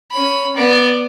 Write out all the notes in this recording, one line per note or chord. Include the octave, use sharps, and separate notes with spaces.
C#4 B5
B3 D5